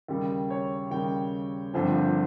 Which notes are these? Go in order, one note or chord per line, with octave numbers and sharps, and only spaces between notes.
D#2 C#3 G3
C#5
D#2 C#3 G3 G5
G1 G2 F3 C4